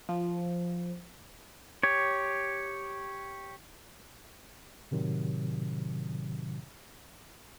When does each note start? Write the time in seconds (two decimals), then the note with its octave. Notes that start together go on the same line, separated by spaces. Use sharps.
0.09 F3
1.83 G4 C#5
4.91 A2 C3 D#3 F#3